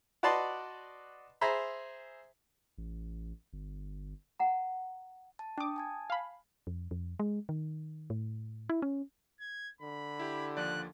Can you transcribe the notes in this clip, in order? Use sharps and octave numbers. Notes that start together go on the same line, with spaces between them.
F#4 B4 D5 D#5 A5 C6
G#4 C5 E5 A#5 B5
A1
G1
F#5 A#5
A5
D4 G5 D6 D#6
G#5 A5 G#6
F5 B5
F2
F2
G#3
D#3
A2
E4
C#4
G#6
D3 B5
E4 G4
D#2 F3 D5 F#6